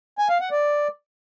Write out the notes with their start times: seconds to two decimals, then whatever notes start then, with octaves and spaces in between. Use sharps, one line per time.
0.19 G#5
0.29 F5
0.40 F#5
0.51 D5